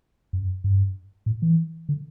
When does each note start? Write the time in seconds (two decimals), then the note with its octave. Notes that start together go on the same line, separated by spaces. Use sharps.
0.33 F#2
0.64 G2
1.26 A2
1.42 E3
1.89 D3